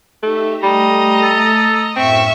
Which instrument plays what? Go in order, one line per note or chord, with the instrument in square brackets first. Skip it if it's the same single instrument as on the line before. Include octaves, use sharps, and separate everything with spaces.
[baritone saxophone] A3 [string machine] D#4 G4 E5
[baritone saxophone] G3 [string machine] A3 [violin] D#5 A#5
[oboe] A4
[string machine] F#2 A2 F5 [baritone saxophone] C4 [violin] E5 C#6